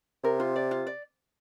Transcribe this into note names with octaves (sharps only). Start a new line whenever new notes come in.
C3 A#4
F4
D5
F4
D5